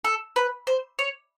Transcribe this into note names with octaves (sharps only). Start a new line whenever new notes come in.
A4
B4
C5
C#5